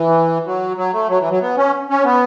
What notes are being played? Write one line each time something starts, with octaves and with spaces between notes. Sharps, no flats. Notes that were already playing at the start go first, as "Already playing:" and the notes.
Already playing: E3
F#3
F#3
A3
F#3
E3
F#3
B3
C#4
C#4
B3